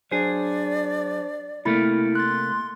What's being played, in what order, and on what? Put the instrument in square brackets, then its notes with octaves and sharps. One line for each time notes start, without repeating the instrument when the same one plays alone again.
[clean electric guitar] F#3 G#4 [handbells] D4 C5 [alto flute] D5
[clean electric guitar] C3 A3 A#3 [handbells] E4 B5 A6
[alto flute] C6 [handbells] F#6 A6